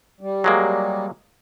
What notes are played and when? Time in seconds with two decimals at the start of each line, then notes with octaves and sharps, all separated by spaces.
0.21 G3
0.44 F#3 G#3 A#3